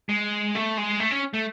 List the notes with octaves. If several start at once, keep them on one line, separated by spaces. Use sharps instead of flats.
G#3
A3
G#3
A3
C#4
A3